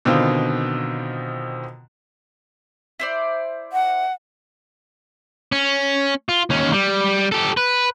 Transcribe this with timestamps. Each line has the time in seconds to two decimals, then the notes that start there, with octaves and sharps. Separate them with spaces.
0.05 B2 D3 D#3 C4 F4
3.00 E4 C5 D5
3.73 F#5
5.52 C#4
6.29 F4
6.50 D#2 C#4
6.73 G3
7.32 G4 A4
7.57 B4